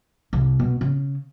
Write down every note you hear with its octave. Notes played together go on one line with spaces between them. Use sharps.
C2
B2
C#3